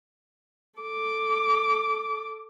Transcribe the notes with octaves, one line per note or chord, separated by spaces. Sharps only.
A4 D6